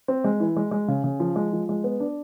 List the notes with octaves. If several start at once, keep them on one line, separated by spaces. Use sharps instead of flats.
C4
G#3
E3
G#3
G#3
C#3
C#3
F3
G#3
F3
G#3
B3
D4